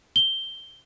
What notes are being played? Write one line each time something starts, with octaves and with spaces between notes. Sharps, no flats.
G7